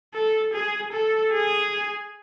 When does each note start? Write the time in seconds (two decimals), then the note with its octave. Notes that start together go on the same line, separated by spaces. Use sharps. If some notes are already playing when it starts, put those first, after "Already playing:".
0.14 A4
0.54 G#4
0.93 A4
1.33 G#4